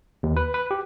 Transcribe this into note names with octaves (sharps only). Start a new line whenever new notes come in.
D#2
B4
B4
G4